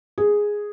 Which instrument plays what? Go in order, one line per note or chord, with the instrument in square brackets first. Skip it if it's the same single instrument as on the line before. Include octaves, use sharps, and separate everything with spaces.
[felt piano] G#4